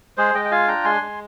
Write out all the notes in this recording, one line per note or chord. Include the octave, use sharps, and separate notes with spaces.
G#3 G#4 C5
G#3 D#5 G5
G5
F4 F5 G#5
D4 G5 A#5
G#3 G#5 C6
G#3